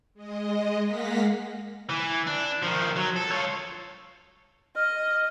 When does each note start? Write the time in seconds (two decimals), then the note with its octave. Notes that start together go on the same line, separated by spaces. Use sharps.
0.14 G#3 D#5
0.84 G#3 A#3 F5 F#5 A#6 B6
1.89 E3
2.27 D4
2.62 D#3 F3
2.96 F#3
3.16 A4
3.32 F4 C#5
4.76 D#5 F6